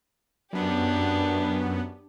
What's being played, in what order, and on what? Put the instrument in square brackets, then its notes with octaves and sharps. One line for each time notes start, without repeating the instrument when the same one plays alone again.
[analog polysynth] F#2 B3 [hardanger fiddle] D4 G4